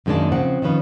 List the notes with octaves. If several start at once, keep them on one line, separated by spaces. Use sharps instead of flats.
F#2 D#3 G#3 A#3 D4 A5
C#3 F3 C4 F#5
D#3 F3 C#4 B4